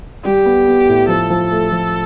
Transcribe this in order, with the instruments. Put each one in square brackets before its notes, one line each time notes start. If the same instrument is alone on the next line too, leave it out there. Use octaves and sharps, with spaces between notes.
[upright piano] G3 [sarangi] G4
[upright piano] B3
B3
A2
[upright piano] F3 [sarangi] A4
[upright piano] F3
A3
F3